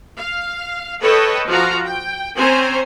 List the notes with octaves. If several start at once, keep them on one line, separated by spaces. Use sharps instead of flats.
F5
A4 B4 C#5 D#5 G5 A5
F3 F4 F#4 F5 A#5
G5
C4 C#4 C5 G#5 A#5